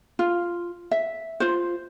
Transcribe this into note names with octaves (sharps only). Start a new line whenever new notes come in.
F4
E5
F4 C5